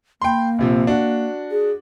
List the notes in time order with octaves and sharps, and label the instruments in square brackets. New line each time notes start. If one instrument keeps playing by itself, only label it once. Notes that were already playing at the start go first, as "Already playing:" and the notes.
[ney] A#3 [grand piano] G5 B5 C6
[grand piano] A#1 C3 F3
D4 F#4
[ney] G#4